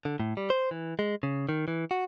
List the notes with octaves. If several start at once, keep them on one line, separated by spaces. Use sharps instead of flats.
D3
A2
G3
C5
E3
G#3
C#3
D#3
E3
F#4